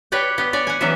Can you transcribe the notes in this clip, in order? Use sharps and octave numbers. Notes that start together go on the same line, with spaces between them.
G4 B4 C#5 D5 G5
B3 G4
C#5 D5 G#5
F#5 G#5
E3 F#3 B3 C#4 G#4 E5